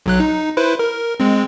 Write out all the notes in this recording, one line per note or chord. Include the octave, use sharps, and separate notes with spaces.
B1 F#3 F#6
D#4
E4 B4 C5
A#4
G#3 C4